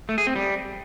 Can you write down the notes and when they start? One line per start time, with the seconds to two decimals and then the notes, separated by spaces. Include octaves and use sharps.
0.09 A3
0.18 G#4
0.27 C4
0.36 G3